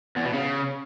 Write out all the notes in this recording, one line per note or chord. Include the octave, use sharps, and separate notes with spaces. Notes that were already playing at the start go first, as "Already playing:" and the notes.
E2
B2
C#3